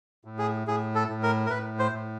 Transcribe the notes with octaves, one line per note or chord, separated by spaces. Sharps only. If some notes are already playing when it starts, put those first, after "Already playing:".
A2
G#4
A2 G#4
A4
A2
A#4
A#4
A2 B4
C5
A2